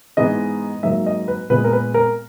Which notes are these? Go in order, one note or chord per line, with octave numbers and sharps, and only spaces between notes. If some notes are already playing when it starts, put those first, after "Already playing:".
G#2 E3 G#3 B3 D#5
G#2 F#3 A#3 E5
D#5
B4
A#2 G#3 B3 B4
A#4
B4
A#4